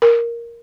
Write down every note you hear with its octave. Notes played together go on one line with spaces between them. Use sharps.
A#4